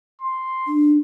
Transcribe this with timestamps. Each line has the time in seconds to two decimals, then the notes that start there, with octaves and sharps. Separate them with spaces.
0.21 C6
0.67 D4